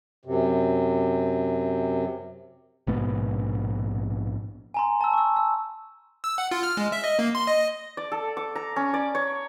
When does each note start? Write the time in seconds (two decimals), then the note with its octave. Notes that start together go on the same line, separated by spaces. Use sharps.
0.25 F#2 C3
2.87 A#1 G#2 B2 B3
4.74 G#5 A#5 C6
5.01 A5 E6
5.13 C#6 E6
5.36 E6
6.24 E6
6.38 F#5
6.51 F4
6.63 F6
6.77 G#3
6.92 E5
7.04 D#5
7.19 A#3
7.35 C6
7.47 D#5
7.97 D5
8.12 A4
8.37 D6
8.56 A#5
8.76 C#4
8.94 D5
9.15 C#5